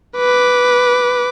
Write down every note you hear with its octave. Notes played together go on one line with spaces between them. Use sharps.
B4 D6